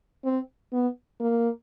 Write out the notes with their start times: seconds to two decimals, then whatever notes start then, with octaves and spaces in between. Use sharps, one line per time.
0.24 C4
0.73 B3
1.20 A#3